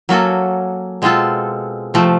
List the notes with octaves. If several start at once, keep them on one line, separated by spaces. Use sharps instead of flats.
F#3 A#3 C#4 F#4 A4
B2 G#3 C4 F4 A4
C3 F3 A3